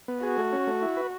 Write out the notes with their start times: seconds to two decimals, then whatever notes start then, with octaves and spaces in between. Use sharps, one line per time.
0.08 B3
0.23 F#4 G#4
0.38 A3
0.52 C#4
0.67 A3
0.82 E4
0.97 B4